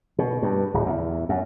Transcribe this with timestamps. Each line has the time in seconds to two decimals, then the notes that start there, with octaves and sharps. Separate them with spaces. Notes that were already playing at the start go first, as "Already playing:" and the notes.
0.19 B2
0.42 G2
0.74 D1
0.86 E2
1.29 F#2